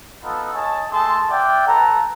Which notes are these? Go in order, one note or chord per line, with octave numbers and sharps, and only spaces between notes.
B3 D#4 F4 A4
C#5 D#5 G#5 A5
A3 G#4 A4 A5 C6
D5 E5 F#5 G5
A4 B4 A#5